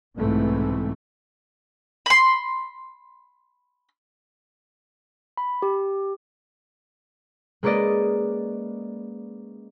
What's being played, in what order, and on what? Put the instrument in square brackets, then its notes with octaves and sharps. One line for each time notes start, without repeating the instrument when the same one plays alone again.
[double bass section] B1 G#2 C3 E3 A3
[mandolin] B5 C6
[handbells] B5
G4
[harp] G#3 A#3 C#4 B4 D5 D#5